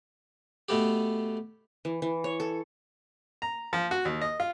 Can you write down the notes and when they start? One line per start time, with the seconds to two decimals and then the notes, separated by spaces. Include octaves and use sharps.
0.69 B2 A3 B3 G4
1.85 E3
2.02 E3
2.24 C#5
2.40 A4
3.42 A#5
3.73 F3
3.91 F#4
4.05 D#2
4.21 D#5
4.40 F4